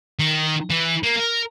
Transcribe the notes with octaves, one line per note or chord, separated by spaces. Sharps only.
D#3
E3
A#3
A#4